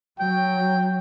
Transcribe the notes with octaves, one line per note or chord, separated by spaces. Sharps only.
F#3 G5